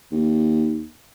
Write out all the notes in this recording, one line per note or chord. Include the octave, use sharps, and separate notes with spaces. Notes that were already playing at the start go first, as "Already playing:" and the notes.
D#2